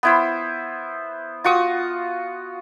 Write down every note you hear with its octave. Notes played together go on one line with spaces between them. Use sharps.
B3 E4 C5
F4 F#4 C#6 D#6